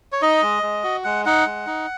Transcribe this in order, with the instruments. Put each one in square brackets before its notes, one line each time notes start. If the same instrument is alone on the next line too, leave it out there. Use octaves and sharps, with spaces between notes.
[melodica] C#5
D#4 D#5
G#3
G#3
F#4
G#3 F#5
D#4 F#5
G#3
D#4